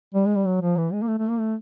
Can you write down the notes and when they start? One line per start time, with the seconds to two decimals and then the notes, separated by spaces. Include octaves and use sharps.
0.14 G3
0.26 G#3
0.36 G3
0.46 F#3
0.61 F3
0.77 E3
0.93 G#3
1.02 A#3
1.08 A3
1.18 A3
1.29 A#3
1.39 A3